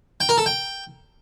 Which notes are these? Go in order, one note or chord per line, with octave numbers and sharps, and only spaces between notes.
G5
A#4
A4
G5